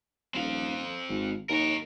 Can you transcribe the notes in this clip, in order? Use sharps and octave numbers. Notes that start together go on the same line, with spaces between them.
D#1 C4 F5
G#1
D#2 A#4 C#5